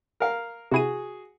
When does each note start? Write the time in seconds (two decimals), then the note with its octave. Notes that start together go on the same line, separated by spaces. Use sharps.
0.20 A#4 F5
0.72 C3 E4 F#4 G#4 D#7